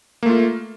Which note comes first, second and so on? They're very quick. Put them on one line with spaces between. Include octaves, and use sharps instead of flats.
A#3 A3 F4